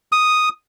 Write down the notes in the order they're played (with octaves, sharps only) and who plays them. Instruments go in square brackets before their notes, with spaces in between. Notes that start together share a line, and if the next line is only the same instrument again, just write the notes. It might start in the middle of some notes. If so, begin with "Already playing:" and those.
[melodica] D#6